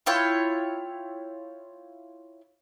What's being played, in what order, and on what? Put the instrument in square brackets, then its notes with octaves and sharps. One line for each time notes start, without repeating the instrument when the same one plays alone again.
[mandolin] E4 F4 C#5 G5